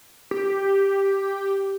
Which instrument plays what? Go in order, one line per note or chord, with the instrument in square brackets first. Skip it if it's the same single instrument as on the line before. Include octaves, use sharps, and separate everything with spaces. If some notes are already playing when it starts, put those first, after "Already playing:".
[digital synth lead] G4